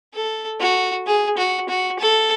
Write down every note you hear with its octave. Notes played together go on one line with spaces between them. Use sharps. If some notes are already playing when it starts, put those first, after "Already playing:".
A4
F#4
G#4
F#4
F#4
A4